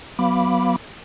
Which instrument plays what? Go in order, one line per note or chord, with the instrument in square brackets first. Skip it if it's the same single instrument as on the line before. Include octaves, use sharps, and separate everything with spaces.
[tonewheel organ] F#3 B3 F5 B5 D6